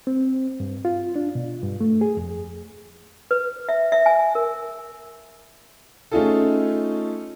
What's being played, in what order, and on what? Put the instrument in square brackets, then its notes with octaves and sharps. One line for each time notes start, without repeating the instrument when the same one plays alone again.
[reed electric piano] C4
G2
F4
D4
B2
G2
A3
G#4
F2
[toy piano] B4
E5
E5
G#5
A#4
[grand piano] A3 C#4 D#4 F4 G#4 A4